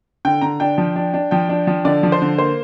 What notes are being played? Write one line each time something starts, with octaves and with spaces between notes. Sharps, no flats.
D3 G5
D3 A#5
D4 G5
F3
D4
D4
F3 G5
D4
F3
D3 D5
F3
C5
D3
A#3 C5